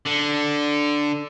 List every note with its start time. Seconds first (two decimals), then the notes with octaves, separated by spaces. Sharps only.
0.07 D3